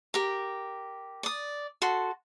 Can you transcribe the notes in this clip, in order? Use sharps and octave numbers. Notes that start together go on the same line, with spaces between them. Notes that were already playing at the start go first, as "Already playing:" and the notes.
G4 A#4
D5 D#6
F#4 A4 C6